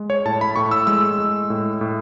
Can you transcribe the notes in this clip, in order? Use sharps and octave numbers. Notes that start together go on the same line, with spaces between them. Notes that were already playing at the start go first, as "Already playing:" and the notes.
Already playing: G#3
C#5
A2 A5
B5
A2 C#6
E6
G#3 E6
G#3
A2
A2